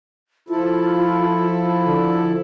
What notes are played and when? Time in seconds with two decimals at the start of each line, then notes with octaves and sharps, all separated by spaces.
0.49 F3 E4 F4 A4
1.86 D3